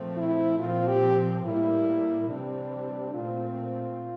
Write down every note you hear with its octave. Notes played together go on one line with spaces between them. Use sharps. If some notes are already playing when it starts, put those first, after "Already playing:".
Already playing: A#2 F3 A3 C4
E4
A#2 F3 C4 F4
G4
A2 G3 A#3 E4
C3 E3 G3 C4 D4
A#2 A3 C4 F4